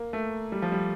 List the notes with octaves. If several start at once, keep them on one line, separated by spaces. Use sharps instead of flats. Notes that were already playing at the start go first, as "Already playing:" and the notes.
Already playing: A#3
A3
G3
F3
G3